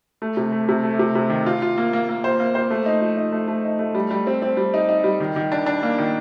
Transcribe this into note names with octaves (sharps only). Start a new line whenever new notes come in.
A3
C3
A3
C3
A3
C3
C3
D#3
F4
F4
A#3
A#3
A#3
C5
A#3
C5
A3
D#4
F3
D#4
A3
A3
D#4
A3
G3
G3
C4
C4
G3
D#4
D#4
G3
D#3
D#3
D4
D4
A#3
D#3